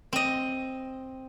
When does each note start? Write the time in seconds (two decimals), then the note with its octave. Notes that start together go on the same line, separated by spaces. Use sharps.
0.13 C4 D#5